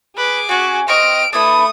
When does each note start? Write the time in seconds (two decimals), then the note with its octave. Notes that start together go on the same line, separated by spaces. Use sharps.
0.16 G#4 B4 D6
0.49 C#4 F#4 G#5
0.88 C4 D#5 G5 C#6 F6 D7
1.33 A3 D4 E4 B4 D#6